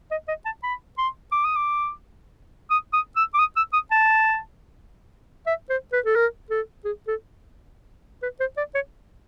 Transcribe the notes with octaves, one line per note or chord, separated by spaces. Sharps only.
D#5
D#5
A5
B5
C6
D6
D#6
D6
D#6
D#6
E6
D6
D#6
E6
D#6
A5
E5
C5
B4
A4
A#4
A4
G#4
A4
B4
C5
D5
C#5